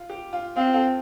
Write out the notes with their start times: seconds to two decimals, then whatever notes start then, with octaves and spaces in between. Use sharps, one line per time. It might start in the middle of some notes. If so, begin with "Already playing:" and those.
Already playing: F4
0.10 G4
0.33 F4
0.56 C4 F4
0.74 F4 A4